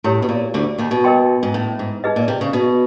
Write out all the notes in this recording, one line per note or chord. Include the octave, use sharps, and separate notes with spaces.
A2 E4 G4 A#4 C#5
B2
A#2
D2 D3
D#2 D#3
B2
A#4 D#5 G5 C6
G#2
A2
G#2
D#4 G#4 B4 D#5
A#2
C3
C#3
B2